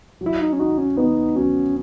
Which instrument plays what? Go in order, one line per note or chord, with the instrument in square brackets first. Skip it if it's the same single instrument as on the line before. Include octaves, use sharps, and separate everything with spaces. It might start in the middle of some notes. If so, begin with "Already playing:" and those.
[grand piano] F#3
[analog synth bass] E4
D#4
C#4
[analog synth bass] D#4 [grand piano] F#4
[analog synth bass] C#4
[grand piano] B3 [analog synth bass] D#4
[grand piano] F#3 [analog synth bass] C#4